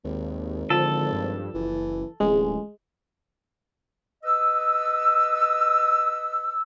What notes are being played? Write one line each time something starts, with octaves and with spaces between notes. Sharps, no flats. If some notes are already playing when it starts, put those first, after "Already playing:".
G#1 D#2
D3 F3 A4
G2
F#1 E3
D1 A1 G#3
B4 D#5 E6